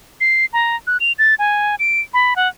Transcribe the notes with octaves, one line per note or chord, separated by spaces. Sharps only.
C7
A#5
F#6
F7
A6
G#5
D7
B5
F#5